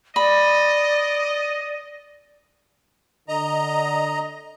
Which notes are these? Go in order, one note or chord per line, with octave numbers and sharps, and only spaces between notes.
D5 D#5 B5
D3 D#5 A#5